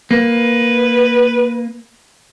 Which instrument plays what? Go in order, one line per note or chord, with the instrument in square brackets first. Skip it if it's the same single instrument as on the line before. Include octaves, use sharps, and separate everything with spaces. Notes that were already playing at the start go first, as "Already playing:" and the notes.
[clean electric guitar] A#3 [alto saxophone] B4